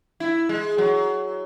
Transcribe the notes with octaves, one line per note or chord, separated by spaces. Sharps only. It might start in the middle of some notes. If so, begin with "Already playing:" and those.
E4
G#3
F#3